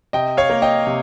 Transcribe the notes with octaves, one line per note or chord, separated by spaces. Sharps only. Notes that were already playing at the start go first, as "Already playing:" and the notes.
C3 D#5 G5
C#5 F5
A#3
D#5 G5
C3